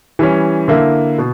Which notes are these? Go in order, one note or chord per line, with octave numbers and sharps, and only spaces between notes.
E3 G3 C#4
D3 A#3 E4
B2